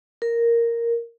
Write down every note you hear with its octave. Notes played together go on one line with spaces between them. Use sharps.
A#4